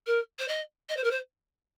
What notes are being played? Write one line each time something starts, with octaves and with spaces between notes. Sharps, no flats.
A#4
C5
D#5
D#5
C5
A#4
C5